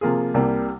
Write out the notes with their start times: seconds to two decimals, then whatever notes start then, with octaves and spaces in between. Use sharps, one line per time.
0.01 C3 F3 A#3 F4 G#4
0.34 C2 C3 G3 A#3